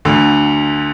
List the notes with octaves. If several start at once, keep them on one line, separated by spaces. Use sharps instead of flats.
D2 D3